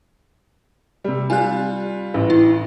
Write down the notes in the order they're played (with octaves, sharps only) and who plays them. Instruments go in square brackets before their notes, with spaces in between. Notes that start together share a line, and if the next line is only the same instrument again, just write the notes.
[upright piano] C3 G3
[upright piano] G3 F4 [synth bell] G#5 F#6
[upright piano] A1
[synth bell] E4